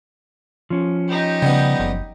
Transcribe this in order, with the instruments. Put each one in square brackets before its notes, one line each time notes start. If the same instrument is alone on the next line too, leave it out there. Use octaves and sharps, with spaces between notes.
[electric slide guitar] F3 C#4
[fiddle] D#4 G4
[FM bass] C#3 [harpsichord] G3 B3
[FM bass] F#1